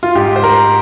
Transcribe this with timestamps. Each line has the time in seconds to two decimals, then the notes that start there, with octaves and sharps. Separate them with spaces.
0.03 F4
0.15 G#2 G4
0.36 C5
0.43 A#4